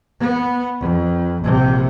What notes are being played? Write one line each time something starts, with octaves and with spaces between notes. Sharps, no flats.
B3
F2
A#1 C3